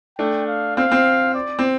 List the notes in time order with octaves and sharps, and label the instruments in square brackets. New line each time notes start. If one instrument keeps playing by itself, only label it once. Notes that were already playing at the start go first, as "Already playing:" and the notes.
[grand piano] A3 D4 [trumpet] G5
[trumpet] F5
[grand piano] C4 [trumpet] F5
[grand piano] C4
[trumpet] D5
[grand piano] C4